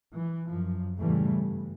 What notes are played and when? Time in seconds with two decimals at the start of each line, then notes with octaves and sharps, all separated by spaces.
0.13 E3
0.49 F#2 F3
0.98 E2 A2 C#3 E3 G3 A3
1.39 G2